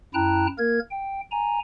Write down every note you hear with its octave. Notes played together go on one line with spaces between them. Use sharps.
F#2 E4 G5 A5 A#5 F#6
A#3 A#4 G#6
G5
G#5 A#5